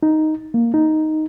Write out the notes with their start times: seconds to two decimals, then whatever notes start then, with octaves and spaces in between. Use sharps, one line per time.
0.03 D#4
0.54 A#3
0.74 D#4